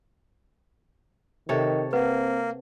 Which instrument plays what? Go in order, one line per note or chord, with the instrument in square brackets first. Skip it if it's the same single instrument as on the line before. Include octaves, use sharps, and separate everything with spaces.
[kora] C3 A4 C#5 [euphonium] D#3
[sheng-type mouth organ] A#3 [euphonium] C4 [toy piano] B4 F#5